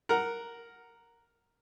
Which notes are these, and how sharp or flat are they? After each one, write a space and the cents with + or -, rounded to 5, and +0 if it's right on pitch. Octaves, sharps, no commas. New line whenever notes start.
A#4 +0 F#5 +0